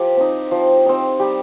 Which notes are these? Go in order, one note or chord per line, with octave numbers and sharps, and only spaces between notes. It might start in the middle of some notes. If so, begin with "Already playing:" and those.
Already playing: F3 G4
C4 D#4
F3
C4 D#4
G3 G4